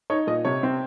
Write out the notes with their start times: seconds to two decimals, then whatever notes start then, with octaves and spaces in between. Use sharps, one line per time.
0.10 D#4 C#5
0.27 A#2 D#5
0.45 C3 C#5
0.63 C4